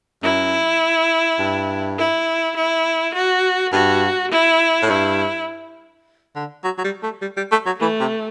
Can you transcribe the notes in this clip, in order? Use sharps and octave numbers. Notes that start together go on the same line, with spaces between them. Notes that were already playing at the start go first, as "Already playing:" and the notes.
F#2 E4
G2
E4
E4
F#4
G2 F#4
E4
A2
G2 E4
D3
F#3
F#3
G3
A3
G3
G3
A3
F#3
E3 A3
C3